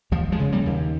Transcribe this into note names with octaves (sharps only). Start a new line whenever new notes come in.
D#2 F3
F3 G#3
C#3
G3 A#3
D#2